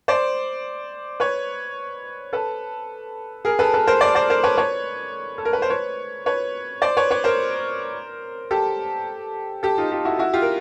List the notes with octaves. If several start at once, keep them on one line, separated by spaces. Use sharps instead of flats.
C5 D5
B4 C#5
A4 B4
G#4 A#4
A4 B4
A4 B4
A#4 C5
C5 D5
C5 D5
A#4 C5
B4 C#5
B4 C#5
A4
A#4
B4
C5
B4 C#5
B4 C#5
C5 D5
B4 C#5
B4 C#5
A#4 C5
G4 A4
G4 A4
D#4 F4
F4 G4
E4 F#4
E4 F#4
F4 G4
A#4